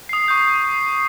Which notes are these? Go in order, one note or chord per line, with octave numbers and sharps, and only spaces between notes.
D#6 C7
C#6 G6
C7